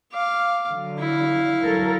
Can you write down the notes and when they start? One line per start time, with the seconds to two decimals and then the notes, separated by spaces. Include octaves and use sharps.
0.12 F5 D6
0.69 D3 F#3
0.99 E4 F5
1.62 F#3 A4 A#4